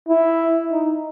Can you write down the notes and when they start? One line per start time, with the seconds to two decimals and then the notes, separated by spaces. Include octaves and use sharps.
0.09 E4
0.71 D#4